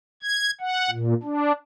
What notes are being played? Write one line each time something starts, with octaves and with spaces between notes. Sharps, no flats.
G#6
F#5
A#2
D4